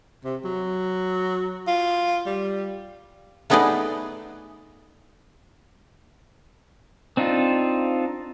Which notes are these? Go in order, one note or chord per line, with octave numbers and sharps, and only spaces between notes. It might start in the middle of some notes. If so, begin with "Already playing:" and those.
C3
F#3
F4
G3
A3 B3 D#4 G#4 B4 D5
C4 D4 D#4 F4